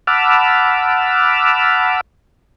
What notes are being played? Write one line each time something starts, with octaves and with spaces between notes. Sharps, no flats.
F#5 A5 B5 D6 E6 F6